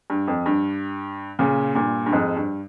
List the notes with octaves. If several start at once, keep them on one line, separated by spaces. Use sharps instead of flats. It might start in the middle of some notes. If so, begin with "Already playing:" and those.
G2
F2
G2
A#2 C#3
G2 A#2
G2
F2 G#2
G2